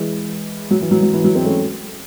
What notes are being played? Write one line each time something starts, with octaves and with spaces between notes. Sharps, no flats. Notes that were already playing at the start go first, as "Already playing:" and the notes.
Already playing: E3 G#3
F#3
E3
F#3
F#3
E3
F#3
G#3 C4
A3 C#4